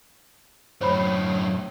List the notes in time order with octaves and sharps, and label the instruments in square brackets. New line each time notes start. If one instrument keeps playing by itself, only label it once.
[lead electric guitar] F#2 A2 [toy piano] C5 C#5 B5